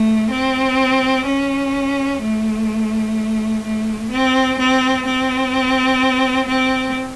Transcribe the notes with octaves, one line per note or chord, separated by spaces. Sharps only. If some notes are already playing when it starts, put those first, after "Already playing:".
Already playing: A3
C4
C#4
A3
A3
C4
C4
C4
C4